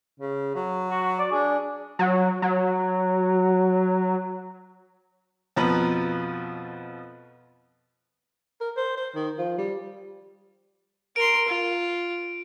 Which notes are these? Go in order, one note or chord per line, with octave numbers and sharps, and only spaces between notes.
C#3
F#3
F#4
D5
D4 G#4
F#3
F#3
F2 B2 F3 B4 A#5 B5
A#4
C5
C5
D#3
F3
G3
A#4 C6 D7
F4